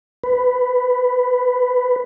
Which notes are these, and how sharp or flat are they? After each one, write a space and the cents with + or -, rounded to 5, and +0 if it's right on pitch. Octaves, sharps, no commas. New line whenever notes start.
B4 +10